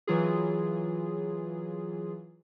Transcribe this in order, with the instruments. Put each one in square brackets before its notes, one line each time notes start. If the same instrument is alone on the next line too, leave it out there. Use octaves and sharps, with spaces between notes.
[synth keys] E3 F#3 F4 G#4